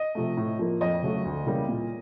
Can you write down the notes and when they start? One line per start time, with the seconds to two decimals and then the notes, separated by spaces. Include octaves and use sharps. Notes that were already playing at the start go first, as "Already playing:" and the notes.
Already playing: D#5
0.15 C3 F3 A3
0.37 A2
0.59 F3 A#3
0.81 F2 D#5
1.02 C#3 F#3 A3
1.25 D2
1.46 C#3 E3 G3 A#3
1.68 A#2